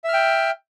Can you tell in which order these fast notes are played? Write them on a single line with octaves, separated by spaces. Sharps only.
E5 F6 G5